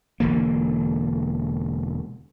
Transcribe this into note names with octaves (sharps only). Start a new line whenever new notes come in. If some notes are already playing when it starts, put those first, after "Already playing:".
E1 D3 A#3